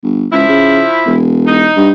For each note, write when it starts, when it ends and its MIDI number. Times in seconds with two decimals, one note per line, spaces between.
0.03 0.27 31
0.33 0.45 37
0.33 1.19 53
0.33 1.19 64
0.48 0.83 49
1.06 1.70 28
1.47 1.91 63
1.76 1.92 43